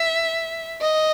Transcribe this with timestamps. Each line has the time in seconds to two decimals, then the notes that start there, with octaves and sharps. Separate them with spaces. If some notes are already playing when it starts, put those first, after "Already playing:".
Already playing: E5
0.81 D#5